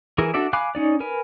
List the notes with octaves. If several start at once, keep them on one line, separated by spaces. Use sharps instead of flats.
E3 E4 G#4 A#4
D4 F#4 A4 D5 E5
F5 G#5 B5 D6 F#6
C#4 D#4 D5
A#4 B4 G#5